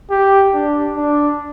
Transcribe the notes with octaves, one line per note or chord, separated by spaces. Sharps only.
G4
D4
D4